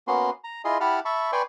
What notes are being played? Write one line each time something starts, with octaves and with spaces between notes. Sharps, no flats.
A#3 B3 C#4 F#4 C6
A#5
E4 F4 G#4 D#5 C6
E4 G4 F#5 A5 B5 F6
E5 A5 B5 C#6
B4 D5 G5 G#5 C6 C#6